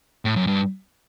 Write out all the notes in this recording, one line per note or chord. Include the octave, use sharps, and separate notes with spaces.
A2
F#2
G2